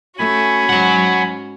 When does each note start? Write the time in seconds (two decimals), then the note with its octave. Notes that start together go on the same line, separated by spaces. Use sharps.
0.18 A3 C#4 F#4 G#5 B5
0.69 G#2 F#3 F#5